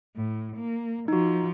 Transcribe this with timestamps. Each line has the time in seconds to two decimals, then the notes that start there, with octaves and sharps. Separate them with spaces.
0.15 A2
0.56 A#3
1.08 F3 D#4 F#4